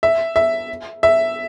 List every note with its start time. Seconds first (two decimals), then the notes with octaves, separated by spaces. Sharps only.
0.03 E5
0.36 E5
1.03 E5